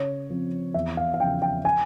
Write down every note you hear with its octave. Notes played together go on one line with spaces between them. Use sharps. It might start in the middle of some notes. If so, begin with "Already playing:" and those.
Already playing: C#3 C#5
F3 C4
E2 E5
F5
F5
C#3 F3 G5
G5
G#5